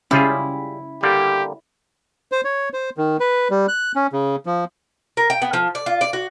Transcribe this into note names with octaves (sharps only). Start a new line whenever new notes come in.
C#3 G3 C#4 E4 F4 G#4
D3 G3 A#3 G4
C5
C#5
C5
D#3
B4
G3
F#6
C#4
C#3
F3
A#4
G5
B3
F3
D5
F4
D5
F#4